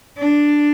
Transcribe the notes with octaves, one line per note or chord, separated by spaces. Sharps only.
D4